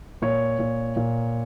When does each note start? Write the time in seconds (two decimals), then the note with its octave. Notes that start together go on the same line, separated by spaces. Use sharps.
0.22 A#2 C#5
0.59 A#2
0.96 A#2